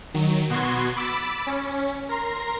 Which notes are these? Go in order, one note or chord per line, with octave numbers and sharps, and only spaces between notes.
D#3 F#3
B2 B3 F#4 C6 G#6
B5 D6 E6 A6
C#4
A#4 A#5 C6